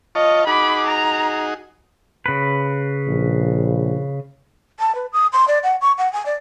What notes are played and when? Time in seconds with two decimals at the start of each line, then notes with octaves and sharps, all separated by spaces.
0.15 F4 C#5 D#5 A5
0.47 D#4 F#4 G#4 B5 D6
0.87 A#5
2.26 C#3 B4
3.07 A#1
4.79 A5
4.95 B4
5.13 D#6
5.33 C6
5.48 D5
5.63 F#5
5.81 C#6
5.98 F#5
6.13 G#5
6.26 D5